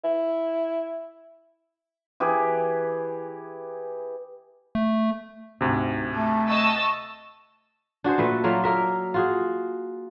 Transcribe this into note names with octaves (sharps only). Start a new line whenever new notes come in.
E4
E3 G4 G#4
A3
D2 G#2 C3
A3 A5
D#5 A5 C#6 E6
D4 F#4 G#4 C5
A#2 A3 B4 E5
F#3 A3 A#3 F4
A#3 A#4 E5
F4 F#4 G#4